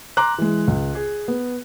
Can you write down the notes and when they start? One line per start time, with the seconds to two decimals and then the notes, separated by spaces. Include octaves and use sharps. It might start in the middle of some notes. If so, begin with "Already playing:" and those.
0.17 A#5 C6 D6 F#6
0.38 E3 G#3
0.68 C#2
0.95 G#4
1.28 B3